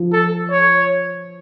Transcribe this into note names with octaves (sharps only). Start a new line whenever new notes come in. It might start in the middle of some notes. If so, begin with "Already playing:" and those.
Already playing: F3
A4
C#5